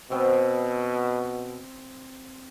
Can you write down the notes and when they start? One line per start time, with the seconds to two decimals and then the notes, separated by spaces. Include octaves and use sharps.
0.12 B2 C4